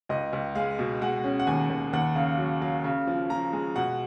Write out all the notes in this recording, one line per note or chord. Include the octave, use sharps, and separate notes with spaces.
C#2 D#5
C#2
G#3 F5
B2
G#3 F#5
C#4
F#5
D#2 G#5
D#2
D#2 F#5
C#3 F5
F#3
F#3 F5
C#3
F3
F3 A#5
G#3
B2 F#5